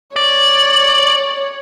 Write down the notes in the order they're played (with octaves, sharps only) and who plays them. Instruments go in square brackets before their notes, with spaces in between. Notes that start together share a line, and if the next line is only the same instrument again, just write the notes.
[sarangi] C#5 [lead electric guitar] D5